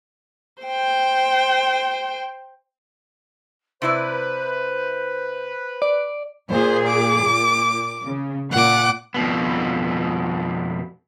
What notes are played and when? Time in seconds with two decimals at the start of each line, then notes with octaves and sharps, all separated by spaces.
0.63 C5 G5
3.82 C3 E4 B4 C5 D5
5.82 D5
6.51 A#2 G#4 C5
6.88 D6
7.25 A#2
8.03 C#3
8.52 A#2 F#5 D6
9.14 F2 B2 B3